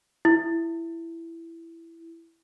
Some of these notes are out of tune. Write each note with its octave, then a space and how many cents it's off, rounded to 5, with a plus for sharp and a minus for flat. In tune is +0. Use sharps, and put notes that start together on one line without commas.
E4 +10